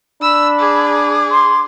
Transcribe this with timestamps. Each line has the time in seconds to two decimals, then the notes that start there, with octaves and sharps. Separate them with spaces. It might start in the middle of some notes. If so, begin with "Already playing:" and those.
0.22 D4 B5 E6
0.59 G#4 D6
1.31 C6